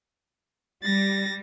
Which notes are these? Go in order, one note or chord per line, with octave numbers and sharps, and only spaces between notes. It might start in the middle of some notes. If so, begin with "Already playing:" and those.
G3 A6 A#6